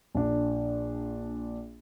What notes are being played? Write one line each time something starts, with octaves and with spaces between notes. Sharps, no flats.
A#1 D4